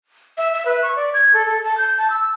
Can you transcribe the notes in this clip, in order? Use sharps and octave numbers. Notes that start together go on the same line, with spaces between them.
E5
E5
B4
C#6
D5
G#6
A4
A4
A5
G6
A5
E6